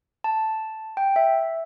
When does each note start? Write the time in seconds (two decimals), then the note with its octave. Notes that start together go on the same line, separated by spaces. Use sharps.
0.24 A5
0.97 G5
1.16 E5